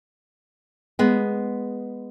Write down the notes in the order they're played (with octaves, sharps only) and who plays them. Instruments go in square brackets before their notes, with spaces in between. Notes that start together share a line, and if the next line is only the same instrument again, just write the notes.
[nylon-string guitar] G#3 B3